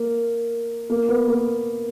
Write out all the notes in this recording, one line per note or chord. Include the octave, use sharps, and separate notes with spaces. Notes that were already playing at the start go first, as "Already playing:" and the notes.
Already playing: A#3
A#3
B3
A#3